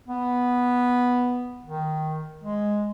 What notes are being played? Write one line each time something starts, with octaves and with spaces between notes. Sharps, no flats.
B3
D#3
G#3